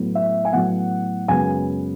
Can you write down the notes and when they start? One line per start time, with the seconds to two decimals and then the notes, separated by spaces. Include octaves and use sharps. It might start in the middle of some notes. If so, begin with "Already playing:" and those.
Already playing: A2 F#3 B3
0.15 E5
0.45 G#5
0.53 A2 F#3 B3 F#5
1.28 F#2 C#3 G#3 B3 G#5